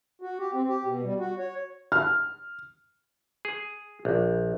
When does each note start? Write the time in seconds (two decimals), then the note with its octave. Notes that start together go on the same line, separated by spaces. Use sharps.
0.22 F#4
0.39 G4
0.54 C4
0.68 G4
0.85 B2
1.04 G3
1.19 F#4
1.39 C#5
1.92 F6
3.45 G#4
4.05 A#1